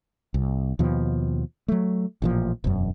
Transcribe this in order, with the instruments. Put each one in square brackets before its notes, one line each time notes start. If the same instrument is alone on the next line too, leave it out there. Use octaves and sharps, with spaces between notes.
[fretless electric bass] C2
D#2 B2 F3
F#3 A3
A1 A#2 F3
E1 F#2